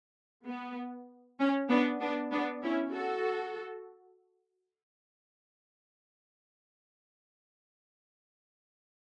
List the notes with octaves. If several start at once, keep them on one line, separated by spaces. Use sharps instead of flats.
B3
C#4
B3 D4
B3 D4
B3 D4
C#4 E4
F#4 A4